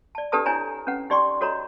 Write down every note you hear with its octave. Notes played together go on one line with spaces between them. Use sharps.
D5 A5
D4 G4 A4 B4 A5 D#6
D4 E4 C#5 G#5 A#5
C#4 B4 F#5
D#4 G4 D5 G5 C6 C#6
F#4 A4 C#5 D#5 A#5